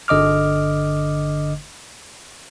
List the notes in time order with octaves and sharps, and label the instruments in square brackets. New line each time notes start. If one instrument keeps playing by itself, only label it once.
[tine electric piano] G1 D3 D#5 D6 F6